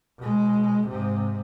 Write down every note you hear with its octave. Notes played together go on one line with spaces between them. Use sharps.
B2 G#3
G#2 C3